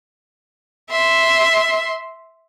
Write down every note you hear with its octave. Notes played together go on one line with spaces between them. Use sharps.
E5 C6